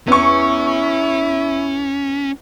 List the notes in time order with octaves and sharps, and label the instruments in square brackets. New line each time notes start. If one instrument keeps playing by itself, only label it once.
[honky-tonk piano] E2 C#6 [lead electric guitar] C#4 [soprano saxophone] E4